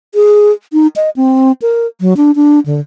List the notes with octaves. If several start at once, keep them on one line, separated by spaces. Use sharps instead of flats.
G#4
D#4
D#5
C4
A#4
F#3
D4
D4
D3